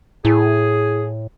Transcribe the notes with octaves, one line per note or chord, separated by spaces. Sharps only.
A2 E4 G#4